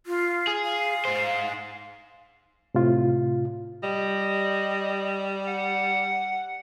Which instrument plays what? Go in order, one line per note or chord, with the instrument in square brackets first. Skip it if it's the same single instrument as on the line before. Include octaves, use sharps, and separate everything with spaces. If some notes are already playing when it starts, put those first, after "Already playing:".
[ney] F4
[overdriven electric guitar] G#4
[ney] F5
[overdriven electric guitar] G#2 C5
[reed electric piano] A2 C3 F4
[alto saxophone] G3 [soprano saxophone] D#5
[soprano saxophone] F#5